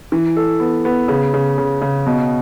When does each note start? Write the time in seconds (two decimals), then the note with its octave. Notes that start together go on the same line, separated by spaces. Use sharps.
0.12 E3
0.37 A4
0.60 B3
0.85 B3
1.08 C#3
1.34 C#3
1.58 C#3
1.82 C#3
2.06 B2